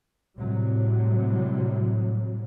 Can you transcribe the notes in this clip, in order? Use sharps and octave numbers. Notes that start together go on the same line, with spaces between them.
A2 C3 F#3 G3